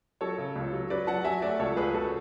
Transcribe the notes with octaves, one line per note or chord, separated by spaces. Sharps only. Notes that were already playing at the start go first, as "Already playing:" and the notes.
F#3 A4 C#5
C#3
C#2
F#3
F#3 B4 D5
F#3 F#5 A5
F#3 E5 G#5
A3 D5 F#5
C#2 A4 C#5
C#2 G#4 B4
C#2 F#4 A4